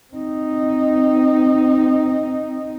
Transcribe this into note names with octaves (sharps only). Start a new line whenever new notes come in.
C4 D#4